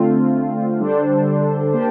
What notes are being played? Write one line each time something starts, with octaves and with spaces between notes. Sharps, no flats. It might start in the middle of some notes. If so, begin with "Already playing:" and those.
Already playing: D3 A3 C4 F4
D3 G3 D4 A4 C5
A#3 D4 G4 C5